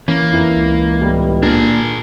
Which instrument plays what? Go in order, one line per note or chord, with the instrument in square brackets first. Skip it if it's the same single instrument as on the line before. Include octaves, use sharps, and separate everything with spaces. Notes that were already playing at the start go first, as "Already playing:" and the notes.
[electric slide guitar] E3 C#4 [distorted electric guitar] A#3
[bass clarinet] F2 [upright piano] E4 B4
[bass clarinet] C#2
[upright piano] A2 G3 B3
[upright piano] A#2 [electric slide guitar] A#3 D4 [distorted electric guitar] G#4 A#4